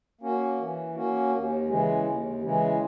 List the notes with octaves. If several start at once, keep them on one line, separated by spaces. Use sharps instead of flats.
A#3 C#4 F#4
E3
A#3 C#4 F#4
D#2
C#3 E3 G#3
D#2
C#3 E3 G#3